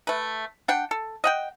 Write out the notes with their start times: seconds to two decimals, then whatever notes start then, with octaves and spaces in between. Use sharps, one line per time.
0.07 A3 B4
0.68 D4 F#5 G5
0.91 A4
1.24 D#5 F#5 G5